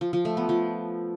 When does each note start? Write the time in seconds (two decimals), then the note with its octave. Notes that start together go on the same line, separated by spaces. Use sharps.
0.01 F3
0.13 F3
0.25 A3
0.37 B3
0.49 F3